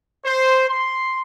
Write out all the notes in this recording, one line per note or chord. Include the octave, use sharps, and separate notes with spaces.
C5
C6